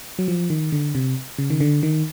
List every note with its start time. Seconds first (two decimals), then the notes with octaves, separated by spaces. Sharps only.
0.19 F#3
0.28 F3
0.50 D#3
0.72 D3
0.95 C3
1.39 C#3
1.50 D#3
1.61 D3
1.83 D#3